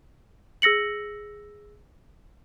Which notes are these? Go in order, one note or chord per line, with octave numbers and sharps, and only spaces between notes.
G#4 E6 A#6 C#7 F#7